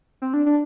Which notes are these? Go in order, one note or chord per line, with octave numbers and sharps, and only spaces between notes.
C4
D4
D4